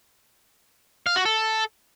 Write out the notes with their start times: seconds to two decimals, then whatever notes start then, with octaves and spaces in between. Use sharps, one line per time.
1.07 F5
1.16 F#4
1.25 A4